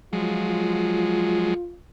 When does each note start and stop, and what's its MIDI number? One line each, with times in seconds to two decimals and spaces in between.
0.13 1.54 53
0.13 1.54 54
0.13 1.54 56
0.13 1.75 65